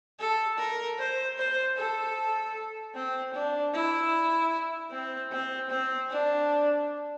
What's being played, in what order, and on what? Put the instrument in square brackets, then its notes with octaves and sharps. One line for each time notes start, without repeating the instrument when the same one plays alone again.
[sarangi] A4
A#4
C5
C5
A4
C4
D4
E4
C4
C4
C4
D4